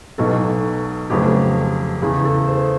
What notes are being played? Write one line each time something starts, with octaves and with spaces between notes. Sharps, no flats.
B1 B2 F#3 A4
F1 F2 C#3 F#3 G4
E2 C#3 E3 G#4
A4
C5